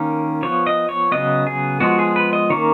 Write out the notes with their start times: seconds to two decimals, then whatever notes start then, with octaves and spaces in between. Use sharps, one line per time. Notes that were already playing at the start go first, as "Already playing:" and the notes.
Already playing: D#3 A#3 C#4
0.43 F3 B3 C#5
0.67 D#5
0.89 C#5
1.12 C#3 F#3 B3 D#5
1.47 G#4
1.80 F3 G#3 B3 F#4
1.99 G#4
2.16 B4
2.33 D#5
2.50 D#3 A#3 C#4 C#5